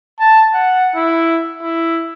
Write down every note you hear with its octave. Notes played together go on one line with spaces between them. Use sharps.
A5
F#5
E4
E4